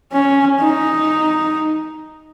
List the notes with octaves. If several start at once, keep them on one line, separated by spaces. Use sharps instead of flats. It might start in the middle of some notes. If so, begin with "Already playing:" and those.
C#4
D#4